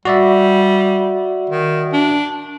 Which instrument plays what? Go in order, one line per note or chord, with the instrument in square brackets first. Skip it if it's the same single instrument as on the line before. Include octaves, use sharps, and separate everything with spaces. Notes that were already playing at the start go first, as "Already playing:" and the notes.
[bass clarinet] G3 [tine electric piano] F#4 D5 E5
[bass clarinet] D#3
D4